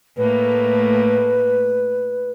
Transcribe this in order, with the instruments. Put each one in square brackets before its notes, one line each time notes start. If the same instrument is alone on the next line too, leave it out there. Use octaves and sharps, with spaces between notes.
[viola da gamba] A2 A3 A#3 [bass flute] B4